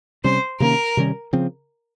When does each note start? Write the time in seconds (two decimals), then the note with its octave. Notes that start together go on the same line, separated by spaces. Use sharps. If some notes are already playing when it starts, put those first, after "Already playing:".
0.24 C3 G3 C#4 C5
0.60 C3 D#3 A#3 C#4 A#4
0.97 C3 D#3 G3 C#4
1.33 C#3 F3 C4